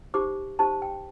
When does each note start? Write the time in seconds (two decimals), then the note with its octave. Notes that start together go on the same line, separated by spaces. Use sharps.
0.14 D#4 G4 C5 D6
0.59 D#4 G4 C5 A5
0.82 G5